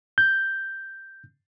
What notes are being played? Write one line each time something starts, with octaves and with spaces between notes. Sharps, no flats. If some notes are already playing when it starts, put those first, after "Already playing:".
G6